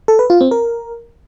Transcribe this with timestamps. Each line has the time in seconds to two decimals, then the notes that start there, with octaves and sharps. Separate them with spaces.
0.08 A4
0.19 B4
0.30 F4
0.41 C4
0.51 A#4